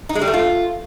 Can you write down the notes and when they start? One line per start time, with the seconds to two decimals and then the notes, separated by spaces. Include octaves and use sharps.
0.09 D#4
0.15 G#3
0.21 G3
0.28 A3
0.34 F4